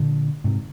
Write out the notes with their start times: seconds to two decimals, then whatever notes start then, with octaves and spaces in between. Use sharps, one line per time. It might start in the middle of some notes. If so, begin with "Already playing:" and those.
Already playing: A#2 D3
0.44 G#2 C3